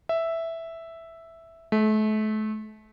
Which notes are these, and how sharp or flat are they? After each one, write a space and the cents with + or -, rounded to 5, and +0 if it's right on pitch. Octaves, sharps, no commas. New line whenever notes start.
E5 +0
A3 -35